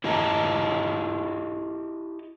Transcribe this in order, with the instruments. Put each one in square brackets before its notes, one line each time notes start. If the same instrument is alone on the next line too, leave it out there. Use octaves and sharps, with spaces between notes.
[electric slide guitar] E4 F#4 G4 D#5 A5 A#5